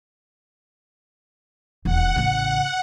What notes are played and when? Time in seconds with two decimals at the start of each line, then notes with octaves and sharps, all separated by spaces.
1.85 D#1 E2 F#5
2.16 A1 C#3